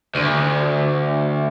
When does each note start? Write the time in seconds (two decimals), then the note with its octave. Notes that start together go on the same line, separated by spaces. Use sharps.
0.15 D2